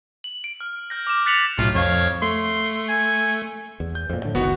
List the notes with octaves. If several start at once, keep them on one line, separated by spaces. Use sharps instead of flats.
F#7
D7
F6
F6 G6 A#6
D6 F6 E7
F#6 A6 B6 C#7 F7 F#7
B1 A2 F4
F2 C#5 F5
A3 C6
G#5
E2
G6
F2 A#2
A2 D3
F#1 C2 D#3 B3 F#4